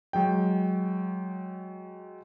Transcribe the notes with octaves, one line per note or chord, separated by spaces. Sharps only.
F#3 G#3 G5